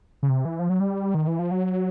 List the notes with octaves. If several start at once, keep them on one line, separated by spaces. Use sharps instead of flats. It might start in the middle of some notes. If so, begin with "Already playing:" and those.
C#3
C3
E3
F3
F#3
G3
D#3
E3
F3
F#3